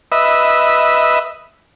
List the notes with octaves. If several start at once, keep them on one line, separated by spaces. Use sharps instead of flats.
B4 D#5 E5